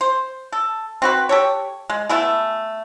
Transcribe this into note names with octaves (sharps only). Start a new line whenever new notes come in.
C5
A4
C4 F#4 B4
G4 A4 C#5
G#3
A3 B3 E4 G#4